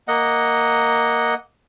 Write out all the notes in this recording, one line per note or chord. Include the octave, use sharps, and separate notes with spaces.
A#3 D#5 F#5